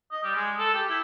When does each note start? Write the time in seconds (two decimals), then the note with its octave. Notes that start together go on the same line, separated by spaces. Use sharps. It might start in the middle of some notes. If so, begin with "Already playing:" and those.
0.12 D#5
0.24 G3
0.35 G#3
0.58 A4
0.74 G4
0.90 E4